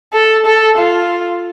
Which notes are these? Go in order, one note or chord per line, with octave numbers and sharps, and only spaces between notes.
A4
A4
F4